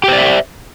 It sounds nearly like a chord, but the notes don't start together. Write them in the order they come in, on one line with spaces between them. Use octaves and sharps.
G4 C5 D5 E5